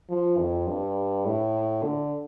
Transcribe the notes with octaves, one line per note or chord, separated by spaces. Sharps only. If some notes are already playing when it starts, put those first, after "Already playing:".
F3
F2
G2
A2
D3